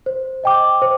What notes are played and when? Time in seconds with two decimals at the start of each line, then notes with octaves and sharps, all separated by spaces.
0.06 C5
0.44 D#5 G5 D6
0.82 C5